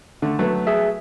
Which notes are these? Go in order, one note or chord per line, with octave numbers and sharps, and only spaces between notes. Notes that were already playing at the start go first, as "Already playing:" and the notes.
D3 A3
F#3 A3 B3
G#4 E5